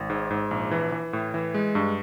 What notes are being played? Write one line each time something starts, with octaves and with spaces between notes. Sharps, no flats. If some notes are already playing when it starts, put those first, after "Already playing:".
Already playing: G#1
G#2
G#2
A#1
E3
E3
A2
E3
G#3
G2